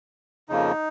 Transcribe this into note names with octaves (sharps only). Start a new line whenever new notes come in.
F2 C#3 F3 A#3 D#4